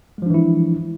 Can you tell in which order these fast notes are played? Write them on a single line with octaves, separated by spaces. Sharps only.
G#3 F3 D4 E3 E4